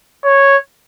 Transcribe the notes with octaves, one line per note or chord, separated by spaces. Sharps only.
C#5